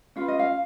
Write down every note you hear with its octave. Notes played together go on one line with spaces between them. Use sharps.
C#4 F4 B4 F5
D#5
F5